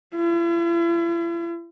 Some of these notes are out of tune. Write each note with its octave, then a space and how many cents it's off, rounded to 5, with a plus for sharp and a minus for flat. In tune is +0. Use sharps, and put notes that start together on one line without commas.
E4 +45